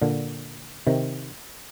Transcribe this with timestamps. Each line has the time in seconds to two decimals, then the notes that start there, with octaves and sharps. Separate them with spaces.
0.02 A#2 D3
0.87 C3 D#3